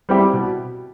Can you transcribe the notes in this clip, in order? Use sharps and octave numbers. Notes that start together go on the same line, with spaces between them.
G3 C4 E4 G4
B2